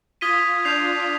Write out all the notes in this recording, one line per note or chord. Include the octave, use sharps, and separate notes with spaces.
F4 D#6 G#6 B6 D#7 G7
D4 G6 C7 F7